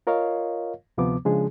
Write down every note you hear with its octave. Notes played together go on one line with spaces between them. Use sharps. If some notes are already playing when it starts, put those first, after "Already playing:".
F4 A#4 C#5 D#5 F5
D2 C3 F3 B3 D6
C#3 F3 G#3 D4 G#4